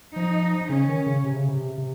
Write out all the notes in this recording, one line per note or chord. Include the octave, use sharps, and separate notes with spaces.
F3 D#4
C#3 C#4
D#3
C#3
C3
C#3
C3
C3